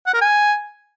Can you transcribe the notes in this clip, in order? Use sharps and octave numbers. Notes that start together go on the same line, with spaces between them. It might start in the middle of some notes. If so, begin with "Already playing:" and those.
F#5
A#4
G#5